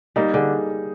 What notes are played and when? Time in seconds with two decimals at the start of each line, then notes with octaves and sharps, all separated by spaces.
0.16 G3 A#3 D#4
0.34 D3 G#4